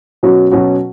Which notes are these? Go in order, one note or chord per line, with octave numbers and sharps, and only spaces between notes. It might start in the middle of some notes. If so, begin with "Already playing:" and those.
B2 F#3 C#4 F#4
B2 F#3 C#4 F#4